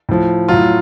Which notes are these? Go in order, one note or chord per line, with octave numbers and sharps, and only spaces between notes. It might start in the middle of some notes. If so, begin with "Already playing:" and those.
A2 F3
A2 F#3 F4